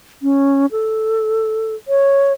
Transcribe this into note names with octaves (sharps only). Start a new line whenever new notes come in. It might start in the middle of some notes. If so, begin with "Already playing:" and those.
C#4
A4
C#5